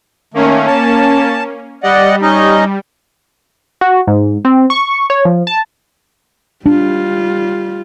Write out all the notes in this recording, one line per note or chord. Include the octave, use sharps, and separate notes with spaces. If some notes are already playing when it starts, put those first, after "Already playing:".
D#3 A3 A#3 C#4
A5
G3 D5 D#5 F#5
C#4 D#4 D#5
F#4
G#2
C4
C#6
C#5
F3
A5
G3 D4 F4